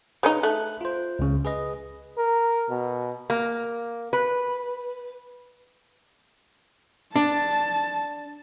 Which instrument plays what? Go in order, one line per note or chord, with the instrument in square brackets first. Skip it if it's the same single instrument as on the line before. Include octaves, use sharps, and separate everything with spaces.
[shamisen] C#3 C#4 D#4 [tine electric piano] B4
[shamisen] A3 [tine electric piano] F#6
[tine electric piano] F4 C5
C#2 C#3
G#4 B4 D#5
[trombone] A#4
B2
[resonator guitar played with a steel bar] A#3
B4
[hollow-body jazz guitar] D4 [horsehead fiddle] A5